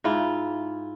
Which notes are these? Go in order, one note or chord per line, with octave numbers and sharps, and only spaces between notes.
G#2 E4 F4